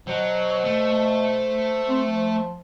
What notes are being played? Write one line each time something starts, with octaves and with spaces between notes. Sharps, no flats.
B2 F#3 C5
A3
C4
F3